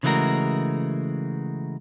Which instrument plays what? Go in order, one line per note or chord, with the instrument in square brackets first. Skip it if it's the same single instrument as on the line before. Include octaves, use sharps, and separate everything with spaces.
[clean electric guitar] C#3 E3 G#3 A3 F#4 A#4